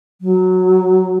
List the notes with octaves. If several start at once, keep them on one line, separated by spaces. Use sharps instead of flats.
F#3